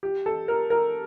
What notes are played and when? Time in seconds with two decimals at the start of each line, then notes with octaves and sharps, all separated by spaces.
0.03 G4
0.26 A4
0.48 A#4
0.70 A#4